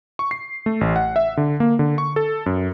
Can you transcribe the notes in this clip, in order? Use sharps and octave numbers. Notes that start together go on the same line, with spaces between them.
C#6
C7
A3
A1
F#5
E5
D3
A#3
D3
C#6
A4
F#2